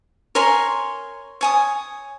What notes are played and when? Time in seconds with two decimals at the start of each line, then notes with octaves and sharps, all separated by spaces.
0.35 A#4 C#5 G#5 C6
1.41 C#5 G#5 D#6